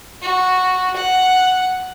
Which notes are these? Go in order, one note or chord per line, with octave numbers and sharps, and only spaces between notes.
F#4
F#5